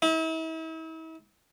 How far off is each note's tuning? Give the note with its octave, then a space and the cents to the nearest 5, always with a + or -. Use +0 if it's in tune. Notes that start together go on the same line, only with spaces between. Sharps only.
E4 -40